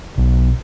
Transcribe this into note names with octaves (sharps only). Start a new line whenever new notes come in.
B1